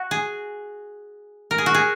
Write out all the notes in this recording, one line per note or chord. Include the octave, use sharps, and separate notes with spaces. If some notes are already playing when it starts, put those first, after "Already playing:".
Already playing: F#4
G#4
A#4
G#4
F#4
G#4